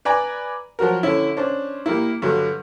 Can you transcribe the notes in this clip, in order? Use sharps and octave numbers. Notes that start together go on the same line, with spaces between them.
B4 D5 G#5 A#5
F3 F#3 F#4 A#4
D3 C#4 E4
C#4 D4 C5
G3 A#3 E4
G2 D3 F#3